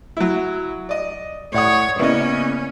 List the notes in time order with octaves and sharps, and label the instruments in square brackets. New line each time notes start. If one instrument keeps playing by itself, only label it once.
[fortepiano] F#3 E4
D5 D#5
[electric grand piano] A2 [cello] C#5 [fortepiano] D5 F#5 D#6
[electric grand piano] C#3 A#3 B3 [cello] C#4 [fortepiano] E4 D5 D#5